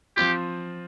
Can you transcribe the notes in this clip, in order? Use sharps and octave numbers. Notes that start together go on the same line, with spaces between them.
F3 C4 F4 G4